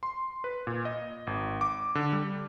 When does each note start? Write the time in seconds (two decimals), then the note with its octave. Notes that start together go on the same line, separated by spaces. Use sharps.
0.03 C6
0.44 B4
0.67 A#2
0.85 D#5
1.27 G#1
1.61 D6
1.95 D3
2.13 G3